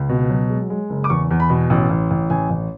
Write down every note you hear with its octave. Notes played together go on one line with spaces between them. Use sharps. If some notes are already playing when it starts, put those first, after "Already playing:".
Already playing: C#2
B2
F#3
G#3
G#3
F#1
D6
E2 C#6
E2
B5
B2
A1
A1
A1
A1 G#5
A1